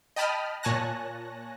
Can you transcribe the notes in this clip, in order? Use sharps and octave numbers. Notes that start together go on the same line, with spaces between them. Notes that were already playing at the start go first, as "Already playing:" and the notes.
D#5 G5 A5 B5 D#6 F6
A#2 C#5 G#5 A5 F#6 A#6